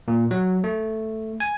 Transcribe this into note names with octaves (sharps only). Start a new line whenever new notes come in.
A#2
F#3
A3
G#5